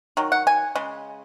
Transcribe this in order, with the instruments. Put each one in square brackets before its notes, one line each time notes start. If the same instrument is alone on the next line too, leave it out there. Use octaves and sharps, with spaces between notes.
[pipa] D#3 F#3
F#5
G#5
C#3 G#3